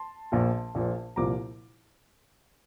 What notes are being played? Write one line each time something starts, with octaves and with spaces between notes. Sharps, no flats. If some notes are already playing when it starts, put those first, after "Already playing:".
Already playing: A5 C6
A#1 A#2 F3
A#1 A#2 F3
C2 A#2 F3 A#5 D6